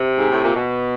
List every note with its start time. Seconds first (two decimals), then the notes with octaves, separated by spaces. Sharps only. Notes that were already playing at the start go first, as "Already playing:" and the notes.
Already playing: C3
0.17 G#2
0.31 A2
0.42 A#2
0.55 B2